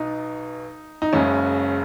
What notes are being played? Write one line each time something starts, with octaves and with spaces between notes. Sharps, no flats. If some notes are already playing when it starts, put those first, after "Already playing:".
Already playing: B1 B2 D#4
D#4
F#1 F#2 C#3 G#3 C#4